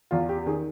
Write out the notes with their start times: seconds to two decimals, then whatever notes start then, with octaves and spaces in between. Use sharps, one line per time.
0.11 E2 F4
0.29 G4
0.46 D#3 G#4